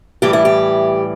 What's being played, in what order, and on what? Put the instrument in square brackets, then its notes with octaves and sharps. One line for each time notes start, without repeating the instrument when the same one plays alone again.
[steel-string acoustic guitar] A2 E3 G3 G4
E4
G4